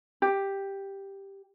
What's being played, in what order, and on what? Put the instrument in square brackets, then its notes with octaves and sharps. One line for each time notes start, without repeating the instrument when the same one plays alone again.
[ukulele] G4